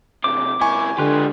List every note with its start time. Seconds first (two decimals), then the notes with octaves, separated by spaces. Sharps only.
0.24 E2 C3 D6
0.61 C#2 E4 G#5 C#6
0.98 D3 G#3 F4 G4 B4